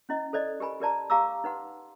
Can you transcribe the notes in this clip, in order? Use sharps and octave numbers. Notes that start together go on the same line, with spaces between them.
C#4 E4 D#5
A4 C5 D5 D#5
G4 A#4 G#5 B5
G4 A#4 D5 A5 A#5
G4 F5 A#5 D6 E6
D#4 B4 F#5 C6